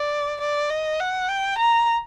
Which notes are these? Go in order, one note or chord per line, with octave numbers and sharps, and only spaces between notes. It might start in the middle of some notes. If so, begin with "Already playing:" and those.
Already playing: D5
D5
D#5
F#5
G5
A#5